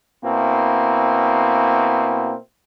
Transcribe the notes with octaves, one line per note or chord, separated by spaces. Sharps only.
B2 A#3 C4 E4